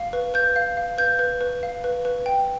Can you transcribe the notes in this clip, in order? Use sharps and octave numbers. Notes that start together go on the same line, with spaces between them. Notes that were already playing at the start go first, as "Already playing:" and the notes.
Already playing: F5
B4
B4 G6
F5
F5
B4 G6
B4
B4
F5
B4
B4
G5